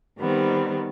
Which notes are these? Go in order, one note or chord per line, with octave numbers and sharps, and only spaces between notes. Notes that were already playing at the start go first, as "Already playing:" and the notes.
D#3 G3 B3 C4